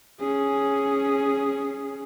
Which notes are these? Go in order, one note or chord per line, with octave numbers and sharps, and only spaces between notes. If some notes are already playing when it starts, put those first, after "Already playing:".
C#4 G#4